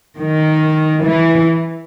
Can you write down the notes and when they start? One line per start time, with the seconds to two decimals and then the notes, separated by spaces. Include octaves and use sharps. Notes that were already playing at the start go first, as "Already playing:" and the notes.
0.18 D#3
1.04 E3